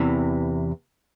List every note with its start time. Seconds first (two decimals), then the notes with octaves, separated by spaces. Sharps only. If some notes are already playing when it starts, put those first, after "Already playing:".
Already playing: E2 C3 E3